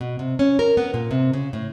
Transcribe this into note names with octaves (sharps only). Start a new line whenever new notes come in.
B2
C3
C#4
A#4
B3
A#2
C3
C#3
A2